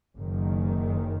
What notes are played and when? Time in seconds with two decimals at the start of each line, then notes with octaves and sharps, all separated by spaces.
0.16 F#1 F#2 D#3